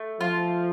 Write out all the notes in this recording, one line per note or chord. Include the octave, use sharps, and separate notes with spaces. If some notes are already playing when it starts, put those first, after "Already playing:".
Already playing: A3
F3 F4